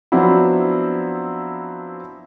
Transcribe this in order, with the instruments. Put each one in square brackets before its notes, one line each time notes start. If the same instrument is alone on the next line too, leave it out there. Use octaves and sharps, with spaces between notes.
[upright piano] F3 F#3 B3 C4 D4 E4